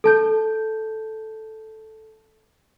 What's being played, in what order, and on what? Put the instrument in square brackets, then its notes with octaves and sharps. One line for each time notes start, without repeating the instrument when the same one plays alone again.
[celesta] A4 A5 G6